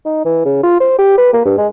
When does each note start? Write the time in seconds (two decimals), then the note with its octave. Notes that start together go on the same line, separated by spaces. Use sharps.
0.05 D#4
0.25 E3
0.45 C#3
0.63 F4
0.80 C5
0.99 G4
1.18 B4
1.33 A#3
1.45 G2
1.58 G#3